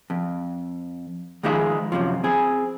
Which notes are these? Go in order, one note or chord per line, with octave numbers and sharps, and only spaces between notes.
F2
D#3 F3 G#3 D#4 G#4 E5
F#2 A2 C3 F3
C4 G#4